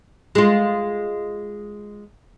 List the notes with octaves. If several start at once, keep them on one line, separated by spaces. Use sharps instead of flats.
G#3 F4